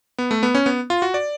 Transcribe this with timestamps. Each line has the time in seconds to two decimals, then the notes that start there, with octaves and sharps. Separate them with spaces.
0.18 B3
0.31 A3
0.43 B3
0.55 C#4
0.66 B3
0.90 F4
1.02 F#4
1.14 D5